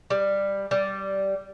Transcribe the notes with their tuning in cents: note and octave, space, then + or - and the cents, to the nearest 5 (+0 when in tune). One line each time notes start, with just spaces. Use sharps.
G3 +10
G3 -10